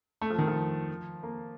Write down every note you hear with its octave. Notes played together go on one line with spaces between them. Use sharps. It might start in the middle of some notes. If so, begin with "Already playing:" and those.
A3
F3
D#3
F3
A#3